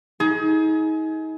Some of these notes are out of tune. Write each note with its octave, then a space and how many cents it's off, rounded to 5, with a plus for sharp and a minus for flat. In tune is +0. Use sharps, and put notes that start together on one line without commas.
D#4 +35 G#4 +25